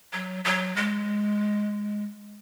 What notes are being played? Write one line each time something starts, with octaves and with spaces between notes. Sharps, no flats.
F#3
F#3
G#3